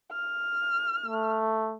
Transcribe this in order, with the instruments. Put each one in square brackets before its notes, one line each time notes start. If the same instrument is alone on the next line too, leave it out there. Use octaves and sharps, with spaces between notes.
[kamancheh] F6
[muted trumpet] A3